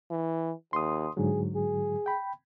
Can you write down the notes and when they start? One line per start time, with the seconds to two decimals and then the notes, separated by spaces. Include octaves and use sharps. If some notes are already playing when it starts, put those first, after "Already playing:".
0.11 E3
0.73 D#2 C6 D#6
1.17 G#2 D3 F#3 G#4
1.55 G#4
2.06 G5 B5